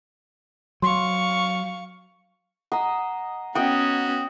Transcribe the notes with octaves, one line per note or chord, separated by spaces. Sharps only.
F#3 F5 C6 C#6
D#5 F#5 A#5
B3 C#4 F#4 D#5 G5